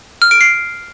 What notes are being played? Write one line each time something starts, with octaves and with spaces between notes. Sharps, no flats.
F6
D7
C7